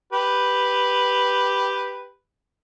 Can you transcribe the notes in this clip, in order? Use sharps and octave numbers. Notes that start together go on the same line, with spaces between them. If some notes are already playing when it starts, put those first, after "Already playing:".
G4 B4